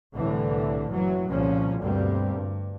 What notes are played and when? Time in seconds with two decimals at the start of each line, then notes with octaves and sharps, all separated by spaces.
0.14 C2 A2 D3 E3
0.89 F#1 E3 F#3
1.29 C2 A#2 C#3 F3 C#4
1.79 D2 G2 B2 G3 A#3 C4
2.32 G2